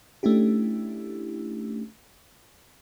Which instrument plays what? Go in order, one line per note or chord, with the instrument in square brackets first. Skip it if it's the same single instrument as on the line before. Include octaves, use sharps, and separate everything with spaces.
[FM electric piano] A3 C#4 D4 E4 G4